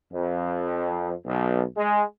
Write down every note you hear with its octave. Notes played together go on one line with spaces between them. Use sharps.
F2
B1
G#3